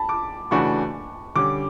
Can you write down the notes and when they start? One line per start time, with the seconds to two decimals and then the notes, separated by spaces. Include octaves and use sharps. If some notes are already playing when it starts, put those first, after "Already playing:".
Already playing: A5 B5
0.09 D6
0.51 C#3 E3 A3 D4 F#4 C#6
1.36 D3 G3 C#4 D6